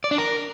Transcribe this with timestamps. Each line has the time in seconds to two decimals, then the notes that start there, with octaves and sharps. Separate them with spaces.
0.04 D5
0.11 D4
0.18 A#4